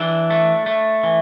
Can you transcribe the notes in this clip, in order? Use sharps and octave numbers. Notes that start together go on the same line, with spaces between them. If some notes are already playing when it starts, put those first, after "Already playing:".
Already playing: E3 D4
A3
A3
E3